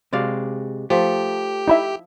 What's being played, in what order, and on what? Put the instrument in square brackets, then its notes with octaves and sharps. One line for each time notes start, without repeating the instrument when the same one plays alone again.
[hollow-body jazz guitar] C3 G#3 [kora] F#4 D5 F5
[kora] F3 [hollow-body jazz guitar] A3 [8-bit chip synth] G4
[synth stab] D#4 E4 E5